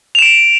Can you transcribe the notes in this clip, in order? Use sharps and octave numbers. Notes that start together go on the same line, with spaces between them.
D7 E7 F7